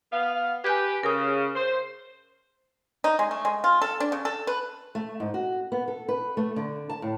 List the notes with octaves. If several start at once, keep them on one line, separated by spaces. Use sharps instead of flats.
B3 F5
G4 B4 G#5 G6 G#6
C#3 A#4 D#6
C5
D#4
G#3
A3
G#3
F4
A4
D4
C#3
A4
B4
A3
G#2
F#4
B3
A4
B4
A3
D3
A5
A2